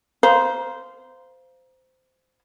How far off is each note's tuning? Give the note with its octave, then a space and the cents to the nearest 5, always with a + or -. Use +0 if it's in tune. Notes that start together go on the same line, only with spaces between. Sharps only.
C5 -15 F5 +0 A#5 +25